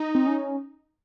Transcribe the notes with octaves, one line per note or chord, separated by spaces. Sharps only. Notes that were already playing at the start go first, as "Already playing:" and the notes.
Already playing: D#4
C4
C#4